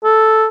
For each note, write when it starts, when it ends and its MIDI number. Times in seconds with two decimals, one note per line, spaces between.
0.04 0.47 69